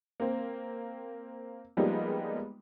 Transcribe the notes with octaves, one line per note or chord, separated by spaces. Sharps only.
A#3 C4
F3 G3 G#3 A#3 B3 D#4